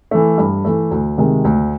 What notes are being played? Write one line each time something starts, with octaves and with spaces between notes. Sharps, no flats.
E3 A3
G2
E3 A3
D2
C3 D#3 G#3
D2